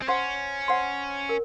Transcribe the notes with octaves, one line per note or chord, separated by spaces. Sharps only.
C4
C#4 C5 F#5 C6
C5 F#5 C6
A#4